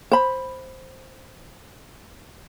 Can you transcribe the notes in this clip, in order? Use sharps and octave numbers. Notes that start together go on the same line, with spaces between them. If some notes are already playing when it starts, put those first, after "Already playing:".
C5 B5